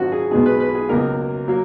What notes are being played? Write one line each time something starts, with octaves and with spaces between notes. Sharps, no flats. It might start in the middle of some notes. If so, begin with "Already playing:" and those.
Already playing: G#1 F#2 F3 F4 F#4
G#4
B1 B2 G#3 B3 G#4
B4
B4
G#4
C#2 B2 F#3 A#3 A#4
F#3 A#3